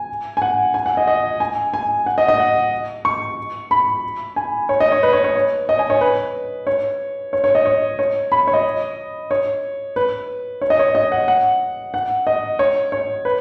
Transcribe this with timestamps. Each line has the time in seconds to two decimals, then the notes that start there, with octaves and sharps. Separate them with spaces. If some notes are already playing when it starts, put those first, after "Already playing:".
Already playing: G#5
0.37 G#5
0.42 F#5
0.74 G#5
0.86 F#5
0.97 D#5
1.08 D#5
1.40 G#5
1.74 G#5
2.06 F#5
2.18 D#5
2.28 D#5
2.40 F#5
3.05 C#6
3.71 B5
4.36 G#5
4.69 C#5
4.80 D#5
4.92 C#5
5.03 B4
5.13 C#5
5.24 C#5
5.35 C#5
5.69 D#5
5.79 G#5
5.90 C#5
6.01 B4
6.67 C#5
7.33 C#5
7.44 C#5
7.55 D#5
7.66 C#5
7.99 C#5
8.32 B5
8.47 C#5
8.53 D#5
9.31 C#5
9.96 B4
10.62 C#5
10.70 D#5
10.79 C#5
10.95 D#5
11.12 F#5
11.28 F#5
11.94 F#5
12.27 D#5
12.59 C#5
12.92 C#5
13.25 B4